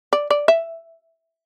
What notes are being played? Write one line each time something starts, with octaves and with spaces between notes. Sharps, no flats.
D5
D5
E5